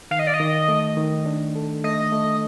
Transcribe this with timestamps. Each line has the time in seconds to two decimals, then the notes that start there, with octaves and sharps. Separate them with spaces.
0.11 D#3 F5
0.19 D#5
0.27 D5
0.34 D#5
0.40 D#3
0.68 A3
0.97 D#3
1.26 D4
1.55 A4
1.84 A3 D#5
2.12 A3